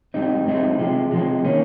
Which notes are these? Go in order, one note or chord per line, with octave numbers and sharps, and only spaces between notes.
G#2 G3 C4 D#4
G#2 G3 C4 D#4
C3 F3 G#3
C3 F3 G#3
D#3 A#3 C#4